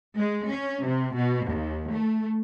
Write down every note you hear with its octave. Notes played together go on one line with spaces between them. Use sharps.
G#3
C#4
C3
B2
D#2
A3